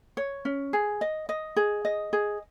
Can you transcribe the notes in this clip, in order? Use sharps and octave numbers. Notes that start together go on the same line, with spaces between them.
C#5
C#4
G#4
D#5
D#5
G#4
D#5
G#4